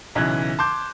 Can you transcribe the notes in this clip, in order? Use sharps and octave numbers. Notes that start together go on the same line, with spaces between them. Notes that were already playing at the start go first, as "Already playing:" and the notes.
B1 C#3 E3 F#6 G#6
A5 C6 D6 G6